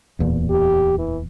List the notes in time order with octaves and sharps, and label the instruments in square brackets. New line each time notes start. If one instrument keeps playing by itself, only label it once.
[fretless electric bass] D1 E2 A#2
[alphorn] G4
E3